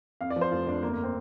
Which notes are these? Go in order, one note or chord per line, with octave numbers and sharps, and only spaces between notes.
F2 F5
D5
F3
C5
F1 F4
F1 D4
G1 A#3
A#3
C4